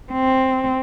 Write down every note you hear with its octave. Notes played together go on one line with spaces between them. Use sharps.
C4